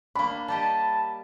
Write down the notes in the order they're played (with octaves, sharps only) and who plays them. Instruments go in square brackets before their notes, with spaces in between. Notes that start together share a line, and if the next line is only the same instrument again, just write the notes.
[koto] A#3 D4 [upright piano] B5
[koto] G3 G4 D#5 [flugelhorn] A5